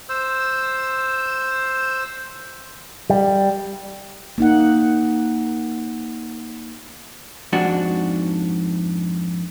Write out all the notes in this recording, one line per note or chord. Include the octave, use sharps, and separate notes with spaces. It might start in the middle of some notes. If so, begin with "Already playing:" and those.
C5 E6
G3
A#3 D#4 F#5
F2 G#2 D4 F#4